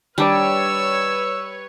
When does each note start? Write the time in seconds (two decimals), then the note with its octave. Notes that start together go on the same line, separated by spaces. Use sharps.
0.18 D#3 G3 D4 B4 C#5 D5 E6